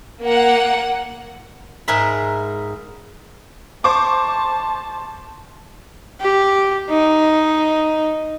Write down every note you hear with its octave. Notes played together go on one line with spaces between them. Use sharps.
A#3 F#5
G#2 G#4 A#4 E5 B5
C5 A5 C#6 D6
G4
D#4